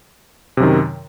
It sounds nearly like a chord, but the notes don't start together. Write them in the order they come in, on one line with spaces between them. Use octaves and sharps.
C3 F#2 D#3